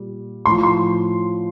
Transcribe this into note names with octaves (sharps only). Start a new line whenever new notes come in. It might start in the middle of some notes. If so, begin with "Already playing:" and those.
Already playing: A#2 G3
A2 F3 C6
C6